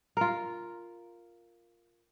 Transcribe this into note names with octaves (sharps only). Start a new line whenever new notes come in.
F4 A#4